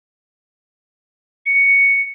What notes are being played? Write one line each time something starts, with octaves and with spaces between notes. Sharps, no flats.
C#7